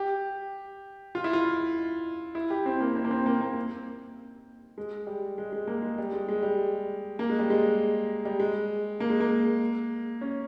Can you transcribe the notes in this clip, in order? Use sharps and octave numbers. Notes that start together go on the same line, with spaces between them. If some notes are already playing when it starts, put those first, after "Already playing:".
Already playing: G4
F4
E4
F4
E4
G4
C4
A#3
C4
A#3
C4
A#3
A#3
G#3
G3
G#3
G#3
A#3
G#3
G3
G#3
G#3
G3
A#3
G#3
G3
G#3
G3
G#3
A#3
G#3
A#3
C#4